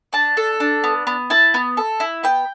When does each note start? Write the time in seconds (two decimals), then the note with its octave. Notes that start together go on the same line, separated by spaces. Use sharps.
0.13 D4 A5
0.37 A4
0.60 D4
0.84 B3
1.07 B3
1.30 E4 A5
1.54 B3
1.77 A4
2.00 E4
2.23 B3 G5